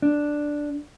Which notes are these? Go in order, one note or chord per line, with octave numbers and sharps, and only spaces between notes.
D4